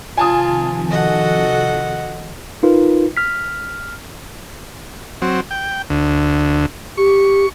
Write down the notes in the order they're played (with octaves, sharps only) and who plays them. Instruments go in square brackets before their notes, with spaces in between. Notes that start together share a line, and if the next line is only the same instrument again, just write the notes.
[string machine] C3 D#3 F3 [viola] F4 [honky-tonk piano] G#5 A5 D#6
[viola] F#4 A4 [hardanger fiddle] D#5 F#5
[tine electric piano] D#4 F4 A#4 B4
F6 B6
[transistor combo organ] F#3 C4
G5
D2
[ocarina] G4 [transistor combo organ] C#6